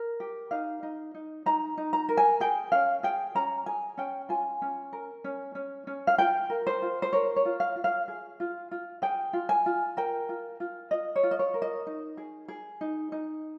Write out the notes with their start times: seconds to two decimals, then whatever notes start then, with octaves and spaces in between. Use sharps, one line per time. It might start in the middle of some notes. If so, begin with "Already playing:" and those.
Already playing: A#4
0.20 G4
0.51 D#4 F5
0.83 D#4
1.14 D#4
1.46 D#4 A#5
1.77 D#4
1.93 A#5
2.09 A#4
2.17 G#5
2.40 G#4 G5
2.72 C#4 F5
3.03 G#4 G5
3.35 C#4 A#5
3.66 G#4 G#5
3.97 C#4 G5
4.29 F4 G#5
4.62 C#4
4.93 A#4
5.24 C#4
5.55 C#4
5.87 C#4
6.07 F5
6.18 F4 G5
6.50 A#4
6.67 C5
6.82 F4
7.02 C5
7.13 A#4 C#5
7.36 C#5
7.45 F4
7.60 F5
7.76 F4
7.84 F5
8.08 G#4
8.40 F4
8.71 F4
9.02 G#4 G5
9.33 F4
9.49 G#5
9.66 F4
9.97 A#4 G5
10.29 F4
10.60 F4
10.91 F4 D#5
11.16 C#5
11.23 F4
11.31 D#5
11.39 C#5
11.54 A#4
11.62 D#5
11.87 D#4
12.17 G#4
12.48 G#4
12.81 D#4
13.12 D#4